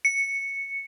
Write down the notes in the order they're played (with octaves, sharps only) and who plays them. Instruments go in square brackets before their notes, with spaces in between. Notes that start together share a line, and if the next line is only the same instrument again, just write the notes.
[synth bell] C#7